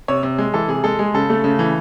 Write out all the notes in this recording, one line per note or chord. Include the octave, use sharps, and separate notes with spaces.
C3 C#5
C3
G#3
E3 A4
C3 G#4
G#3 A4
G#3 G#4
C#3 A4
A3
C#3
E3